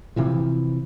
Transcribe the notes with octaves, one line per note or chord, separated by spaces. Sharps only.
C3 E3 F3